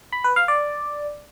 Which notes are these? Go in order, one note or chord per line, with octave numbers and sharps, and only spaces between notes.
B5
B4
F5
D5